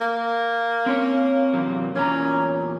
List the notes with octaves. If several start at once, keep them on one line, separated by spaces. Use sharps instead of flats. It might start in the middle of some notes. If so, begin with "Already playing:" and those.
A#3
C4 C#5
E2 C3 F#3
E2 A#2 C#4 A#5